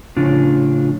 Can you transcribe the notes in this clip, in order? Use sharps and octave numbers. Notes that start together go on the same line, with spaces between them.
A2 C#3 F3 C#4 D4 F4